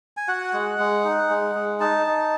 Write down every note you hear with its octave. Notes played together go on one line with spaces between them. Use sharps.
G#5
F#4 F#5
G#3
G#3
D#4
G#3
G#3
D#4 A5
D#4